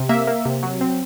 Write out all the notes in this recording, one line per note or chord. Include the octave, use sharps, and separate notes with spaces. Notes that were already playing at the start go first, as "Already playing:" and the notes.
Already playing: C3
A#3 E5
A#3
C3
F#3
C4